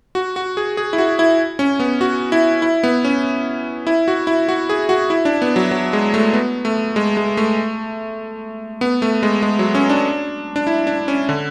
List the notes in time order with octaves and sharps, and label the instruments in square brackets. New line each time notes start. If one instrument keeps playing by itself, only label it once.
[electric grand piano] F#4
F#4
G#4
G#4
E4
F#4
E4
C#4
B3
F#4
E4
E4
B3
C#4
E4
F#4
E4
F#4
G#4
F#4
E4
D4
B3
F#3
F#3
G#3
A3
B3
A3
G#3
G#3
A3
B3
A3
G#3
G#3
F#3
C#4
D4
D4
E4
D4
C#4
D3